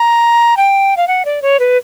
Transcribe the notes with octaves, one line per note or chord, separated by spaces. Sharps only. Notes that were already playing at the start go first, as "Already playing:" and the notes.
Already playing: A#5
G5
F5
F#5
D5
C#5
B4